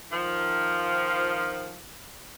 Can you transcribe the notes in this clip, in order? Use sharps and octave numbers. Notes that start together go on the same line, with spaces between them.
D#3 F3